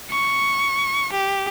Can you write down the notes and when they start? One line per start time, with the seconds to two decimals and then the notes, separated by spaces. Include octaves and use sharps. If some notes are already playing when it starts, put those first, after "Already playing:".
0.10 C#6
1.12 G4